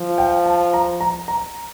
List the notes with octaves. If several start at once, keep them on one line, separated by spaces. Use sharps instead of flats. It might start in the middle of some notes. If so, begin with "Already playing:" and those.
Already playing: F3
G5
A5
A#5
A#5
A#5